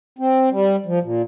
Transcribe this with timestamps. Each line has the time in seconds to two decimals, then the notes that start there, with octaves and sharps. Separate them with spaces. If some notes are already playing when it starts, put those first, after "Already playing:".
0.19 C4
0.51 G3
0.86 F3
1.04 A#2